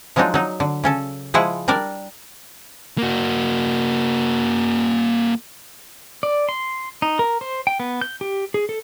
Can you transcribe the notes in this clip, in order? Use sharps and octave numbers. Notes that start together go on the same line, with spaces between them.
F3 F#3 G#3 D4 D#4
F#3 D#4
D3
C#3 C#4 A4
F3 G#3 E4 G#4 F#5
G3 D4 A#4 D5
A#3 F#4
D5
C6
D#4
A#4
C5
G5
B3
G6
G4
G#4
A4